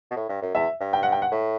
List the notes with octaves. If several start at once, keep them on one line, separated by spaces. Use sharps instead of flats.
B2
A2
G2
F#2
E2 E5
G2
G5
F#5
G5
F#5
A2